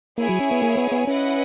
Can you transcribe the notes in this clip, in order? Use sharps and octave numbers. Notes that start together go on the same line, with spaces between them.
A#3 E4 G#4 C#5 G#5
F#3
C#4
B3
A#3
B3
B3
C#4 E4 B4 D#5 F#5